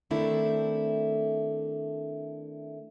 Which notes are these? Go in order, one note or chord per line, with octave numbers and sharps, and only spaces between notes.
D#3 A3 C4 D4 E4 A4